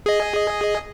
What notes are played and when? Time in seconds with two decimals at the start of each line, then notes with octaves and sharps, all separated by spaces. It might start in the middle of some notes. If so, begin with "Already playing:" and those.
0.06 G#4 D#5